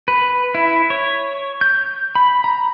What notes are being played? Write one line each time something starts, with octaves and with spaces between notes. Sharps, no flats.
B4
E4
C#5
G6
B5
A#5